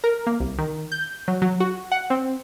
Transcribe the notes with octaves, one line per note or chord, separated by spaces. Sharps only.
A#4
A#3
C2
D#3
G6
F#3
F#3
F#4
F#5
C4